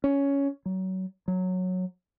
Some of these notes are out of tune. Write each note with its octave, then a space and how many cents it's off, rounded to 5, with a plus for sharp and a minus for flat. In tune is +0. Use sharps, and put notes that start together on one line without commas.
C#4 +10
F#3 +25
F#3 -10